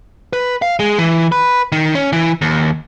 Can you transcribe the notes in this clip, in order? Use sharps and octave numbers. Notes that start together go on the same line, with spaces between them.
B4
F5
G#3
E3
B4
D#3
C#4
E3
D#2